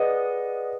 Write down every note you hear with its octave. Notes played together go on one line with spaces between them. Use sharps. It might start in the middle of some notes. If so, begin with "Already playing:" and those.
Already playing: G#4 B4 D5 D#5 F#5